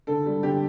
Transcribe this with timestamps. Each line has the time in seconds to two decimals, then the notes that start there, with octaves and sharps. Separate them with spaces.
0.07 D3 A4
0.26 G3
0.43 D3 G4